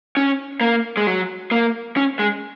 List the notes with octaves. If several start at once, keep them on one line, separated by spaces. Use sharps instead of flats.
C#4
A#3
G#3
F#3
A#3
C#4
G#3